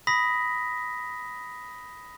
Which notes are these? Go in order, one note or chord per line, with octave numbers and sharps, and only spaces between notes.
B5 D#6 A#6 B6